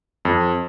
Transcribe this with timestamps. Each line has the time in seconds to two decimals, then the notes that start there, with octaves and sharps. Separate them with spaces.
0.25 F2